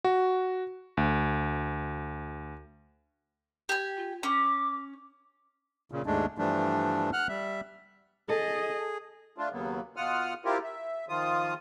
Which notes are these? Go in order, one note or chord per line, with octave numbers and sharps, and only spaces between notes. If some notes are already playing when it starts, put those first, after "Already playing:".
F#4
D2
G4 G#5
F4
C#4 D6
A#2 C#3
D#2 G#2 G#3 A3 D4
G2 E3 F3 G3 A3 D4
F#5 F6 F#6
G3 E5
G#4 A4 D#5
A3 D4 F4
D#2 C#3 F#3 A#3 B3
B2 F4 F#5 D#6 F6
C4 E4 F4 G4 A#4
E5
D#3 F3 F4 D#6